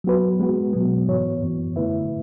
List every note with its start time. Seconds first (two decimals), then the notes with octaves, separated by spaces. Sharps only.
0.04 F#3 B3 F#4 B4
0.40 G#3 B3 F#4
0.73 B2 F#3 B3
1.08 G#2 E3 B3 F#4 C#5
1.42 F#2 E3 B3
1.76 D3 A3 E4 B4 E5